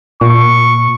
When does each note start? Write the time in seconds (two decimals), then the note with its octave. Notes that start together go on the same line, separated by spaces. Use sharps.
0.21 A#2 C#6